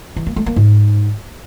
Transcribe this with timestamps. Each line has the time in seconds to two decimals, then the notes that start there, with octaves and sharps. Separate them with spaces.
0.16 E3
0.26 A#3
0.36 A3
0.46 A#3
0.56 G#2